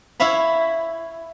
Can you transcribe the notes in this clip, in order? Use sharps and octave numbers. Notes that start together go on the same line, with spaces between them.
E4 C#5 E5 F5 B5